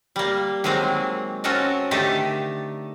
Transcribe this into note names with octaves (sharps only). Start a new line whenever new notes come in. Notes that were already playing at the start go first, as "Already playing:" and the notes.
G3 A#3
D#3 F#3 G#3 A#3 C4
C4 C#4 F#4 A4 A#4 D#5
D3 D#3 A3 D#4 G4 A4